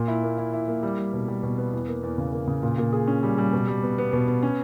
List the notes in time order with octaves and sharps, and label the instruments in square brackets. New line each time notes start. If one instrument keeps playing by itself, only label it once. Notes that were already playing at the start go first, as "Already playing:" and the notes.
Already playing: [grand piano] A#2
E4
A#3
E4
E4
A#3
G3
G3
B2
G3
B2
B3
E2
A#3
E2
C#3
A#3
C#3
A#2
A#2
G#4
C#4
G3
G3
B2
G3
B3
B3
B2
B3
C#4